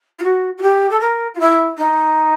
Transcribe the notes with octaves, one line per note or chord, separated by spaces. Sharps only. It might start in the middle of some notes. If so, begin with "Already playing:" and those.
F4
F#4
F#4
G4
A4
A#4
F4
E4
D#4